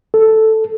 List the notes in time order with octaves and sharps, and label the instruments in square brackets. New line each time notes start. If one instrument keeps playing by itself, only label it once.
[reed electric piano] A4